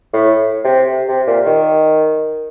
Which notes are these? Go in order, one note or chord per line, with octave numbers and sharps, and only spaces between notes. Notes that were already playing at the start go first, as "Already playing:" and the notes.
A2
C3
C3
A#2
D#3